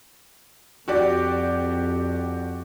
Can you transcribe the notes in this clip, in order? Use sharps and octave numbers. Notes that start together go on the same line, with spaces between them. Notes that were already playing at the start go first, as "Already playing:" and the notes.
F2 F#4 G4 D5